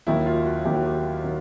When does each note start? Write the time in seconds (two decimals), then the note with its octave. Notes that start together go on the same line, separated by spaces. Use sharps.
0.07 D#2 D#3 F#3 E4
0.26 F4
0.46 F#4
0.65 D#2 D#3 F#3 G4
0.75 F#4
0.86 G4
1.24 D#3 F#3